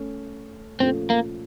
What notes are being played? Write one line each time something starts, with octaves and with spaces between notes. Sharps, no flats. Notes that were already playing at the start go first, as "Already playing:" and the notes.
Already playing: A3 C#4
A#2 F3 A3 C4 C#4 A4
A#3